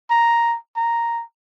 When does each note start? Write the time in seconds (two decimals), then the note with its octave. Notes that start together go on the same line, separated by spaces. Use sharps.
0.10 A#5
0.76 A#5